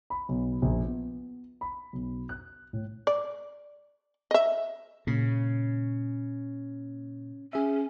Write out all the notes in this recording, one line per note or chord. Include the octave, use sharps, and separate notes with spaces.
B5
B1
A#1
B3
B5
B1
F#6
A2
D5
D#5 E5
A#2 C#3
C#4 G#4 E5